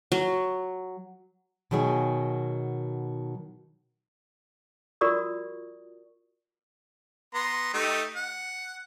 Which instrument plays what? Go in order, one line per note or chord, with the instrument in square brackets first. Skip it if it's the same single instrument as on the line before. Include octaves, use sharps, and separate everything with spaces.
[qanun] F#3
[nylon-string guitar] B2 D#3 F#3 G#4
[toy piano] F4 F#4 A#4 D5 C#6 D#6
[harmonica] B3 A#5 C6
A3 D#4 G4
F#5